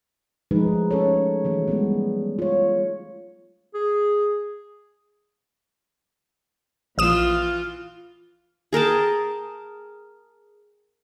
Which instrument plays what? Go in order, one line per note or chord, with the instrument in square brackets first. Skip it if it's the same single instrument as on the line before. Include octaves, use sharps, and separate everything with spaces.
[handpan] F3 G#3 A3 D#4 G#4 B4
C#4 A4 C#5
E3 F#3 A3
G3 G#3 B3
F4 C#5
[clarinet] G#4
[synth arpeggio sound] A#1 D#6 E7 [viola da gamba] E3 F4
[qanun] G#4 A#4 G5 A5